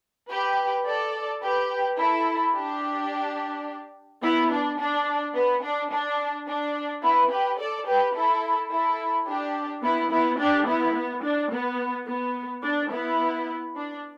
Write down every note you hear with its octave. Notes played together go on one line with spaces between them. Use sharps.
G4 B4
A4 D5
G4 B4
E4 A4
D4 G4
B3 E4
D4
D4
B3
D4
D4
D4
B3 E4
G4 B4
A4 D5
G4 B4
E4 A4
E4 A4
D4 G4
B3 E4
B3 E4
D4 G4
B3 E4
B3
D4
B3
B3
D4
B3 E4
D4